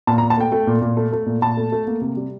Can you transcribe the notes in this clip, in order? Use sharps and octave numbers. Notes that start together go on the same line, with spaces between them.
A#2 A5
A#5
A#2
A5
A3 G5
A3
A#2
A#2
A3
A3
A#2
A#2 A5
A3
A3
A#3
C3
G3